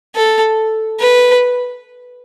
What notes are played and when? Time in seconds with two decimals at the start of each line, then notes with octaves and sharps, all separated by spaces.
0.15 A4
0.99 B4